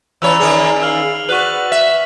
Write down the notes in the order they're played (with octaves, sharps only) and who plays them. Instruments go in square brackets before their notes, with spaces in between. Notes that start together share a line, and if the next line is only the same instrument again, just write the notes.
[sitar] E3 C#4 C#5 [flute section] D5 A#5 B5 [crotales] E6 F7
[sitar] D#3 C#4 G#4
[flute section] F5 [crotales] E6 F6 F#7
[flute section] F#4 D5 [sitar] B4 [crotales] C#6 F#6 F#7
[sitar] E5 [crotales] B6